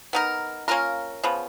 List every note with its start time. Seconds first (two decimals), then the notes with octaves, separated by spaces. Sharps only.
0.13 B3 D#4 A#4
0.68 A#3 C#4 F4 A#4
1.23 C#3 F3 B3